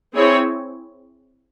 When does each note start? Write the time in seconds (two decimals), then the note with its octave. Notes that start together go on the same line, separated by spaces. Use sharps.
0.15 C4 E4 G#4 C#5